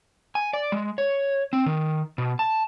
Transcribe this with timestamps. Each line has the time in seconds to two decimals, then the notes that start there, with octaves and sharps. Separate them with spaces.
0.35 G#5
0.53 D5
0.72 G#3
0.98 C#5
1.53 C4
1.66 D#3
2.18 B2
2.39 A5